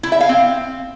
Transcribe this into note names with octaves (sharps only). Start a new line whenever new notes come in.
E4
E5
F5
C4